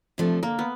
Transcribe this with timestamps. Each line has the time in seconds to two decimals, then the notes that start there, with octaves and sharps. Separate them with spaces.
0.18 C3 F3 A3 D4
0.43 D3 A#3
0.59 B3